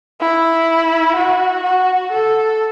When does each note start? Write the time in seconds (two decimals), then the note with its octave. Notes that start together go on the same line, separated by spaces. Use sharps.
0.20 E4
1.16 F#4
1.63 F#4
2.11 A4